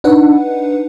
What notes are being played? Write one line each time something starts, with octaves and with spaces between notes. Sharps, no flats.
D4 D#4 B4 F#5